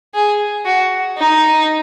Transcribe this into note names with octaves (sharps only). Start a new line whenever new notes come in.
G#4
F#4
D#4